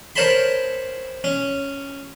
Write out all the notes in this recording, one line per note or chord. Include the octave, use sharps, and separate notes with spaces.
A#4 C5 C#5 A5 B5 C6
C#4